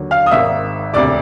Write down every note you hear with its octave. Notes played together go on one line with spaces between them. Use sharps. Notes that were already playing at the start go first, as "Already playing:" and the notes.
Already playing: D#2 D3 F#3
F5 F6
D#6
G#1 G#2 D#3 E5 E6
E1 D2 C3 D5 D6